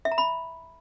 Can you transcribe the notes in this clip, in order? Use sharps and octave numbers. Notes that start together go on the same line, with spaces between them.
E5
A#5
B5